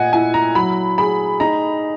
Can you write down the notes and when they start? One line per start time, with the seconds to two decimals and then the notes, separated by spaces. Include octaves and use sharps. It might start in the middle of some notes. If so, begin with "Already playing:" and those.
Already playing: A#2 D#5 F#5 G#5
0.13 E4 G#5
0.34 A#5
0.55 F#3 B5
0.98 G#4 B5
1.40 D#4 A#5